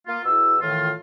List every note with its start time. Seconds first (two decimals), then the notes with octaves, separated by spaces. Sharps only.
0.07 A#3 F4
0.25 B2 E4 G#4 E6
0.61 A2 D#3 E3 F4